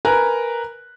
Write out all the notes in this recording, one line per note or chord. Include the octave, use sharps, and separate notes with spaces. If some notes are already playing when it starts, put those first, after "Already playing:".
A#4 B4 G#5 A#5 F#6